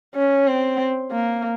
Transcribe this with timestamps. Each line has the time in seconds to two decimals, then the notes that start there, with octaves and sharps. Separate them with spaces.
0.15 C#4
0.47 C4
1.11 A#3